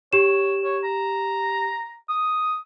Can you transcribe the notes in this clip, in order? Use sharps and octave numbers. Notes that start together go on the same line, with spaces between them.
G4 C#5 E7
C#5
A#5
D#6